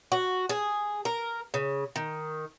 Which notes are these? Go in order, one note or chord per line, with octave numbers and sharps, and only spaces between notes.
F#4
G#4
A#4
C#3
D#3